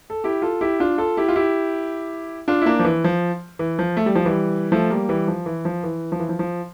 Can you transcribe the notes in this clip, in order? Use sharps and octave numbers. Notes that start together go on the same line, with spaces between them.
A4
E4 G4
F4 A4
E4 G4
D4 F4
F4 A4
E4 G4
F4
E4 G4
D4 F4
E4
A#3 D4
F3
E3
F3
E3
F3
A3
G3
F3
E3 G3
F3 A3
G3 A#3
E3 G3
F3
E3
F3
E3
F3
E3
F3
F3